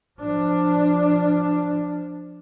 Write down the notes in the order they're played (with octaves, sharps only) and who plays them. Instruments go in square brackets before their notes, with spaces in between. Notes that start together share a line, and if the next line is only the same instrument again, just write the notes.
[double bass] F3 D4